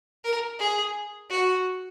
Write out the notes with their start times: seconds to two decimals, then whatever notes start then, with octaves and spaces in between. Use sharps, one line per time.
0.24 A#4
0.59 G#4
1.30 F#4